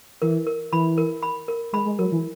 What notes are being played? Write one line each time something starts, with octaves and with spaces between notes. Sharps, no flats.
E3 A#4
A#4
E3 B5
A#4
B5
A#4
G#3 B5
G#3
F#3 A#4
E3